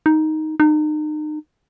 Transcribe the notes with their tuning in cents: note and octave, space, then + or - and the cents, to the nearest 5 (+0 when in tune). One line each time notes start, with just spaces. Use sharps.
D#4 +5
D#4 -35